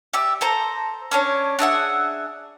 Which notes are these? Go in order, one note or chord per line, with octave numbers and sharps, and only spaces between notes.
G4 D5 E5
A4 C5 A#5
C#4 D4 C#5
D4 G#4 E5 F#5